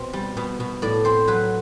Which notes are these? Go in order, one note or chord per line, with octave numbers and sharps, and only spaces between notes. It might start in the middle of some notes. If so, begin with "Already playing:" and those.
Already playing: B2 C4
G3
B2
B2
A2 D5
C4 C5
F#3 B4